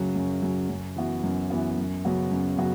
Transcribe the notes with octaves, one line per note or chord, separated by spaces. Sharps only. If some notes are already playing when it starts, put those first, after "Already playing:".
Already playing: F#2 C#3 F#3
F#2
C#3 F#3
F#2
E3 B3 F#4
F#2
E3 B3 F#4
F#2
C#3 F#3 B3 F#4
F#2
C#3 F#3 B3 F#4